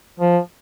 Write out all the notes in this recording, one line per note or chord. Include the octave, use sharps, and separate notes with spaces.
F3